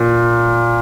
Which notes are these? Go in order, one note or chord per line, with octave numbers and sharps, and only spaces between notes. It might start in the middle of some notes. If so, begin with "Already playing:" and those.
Already playing: A#2